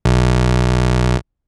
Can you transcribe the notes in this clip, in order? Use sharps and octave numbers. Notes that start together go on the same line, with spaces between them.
B1